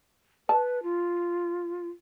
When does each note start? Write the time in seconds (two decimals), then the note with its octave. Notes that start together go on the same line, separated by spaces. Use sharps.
0.49 B4 A5
0.83 F4